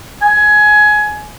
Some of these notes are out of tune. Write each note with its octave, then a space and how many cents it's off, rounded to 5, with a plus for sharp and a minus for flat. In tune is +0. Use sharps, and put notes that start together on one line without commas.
G#5 +20